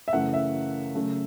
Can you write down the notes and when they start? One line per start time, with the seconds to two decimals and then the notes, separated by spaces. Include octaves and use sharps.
0.08 E5
0.13 F#2 C#3 E3 A3 F#5
0.33 E5
0.95 C#3 F#3 A3